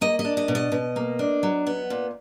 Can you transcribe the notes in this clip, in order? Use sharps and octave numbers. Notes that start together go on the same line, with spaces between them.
A#3 D#5
D#5
D4
D#5
B2
D#5
B2
A#3
D4
F#3
B3
A#2